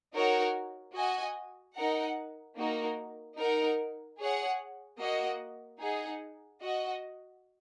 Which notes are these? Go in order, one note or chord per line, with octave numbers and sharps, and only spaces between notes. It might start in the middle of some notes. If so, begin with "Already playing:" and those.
D#4 F#4 A#4 C#5
F#4 D#5 G#5
D#4 A#4 F#5
A#3 D#4 F#4 A#4
D#4 A#4 F#5
G#4 C#5 F#5
A#3 F#4 D#5 F#5
D#4 G#4 F#5
F#4 D#5 F#5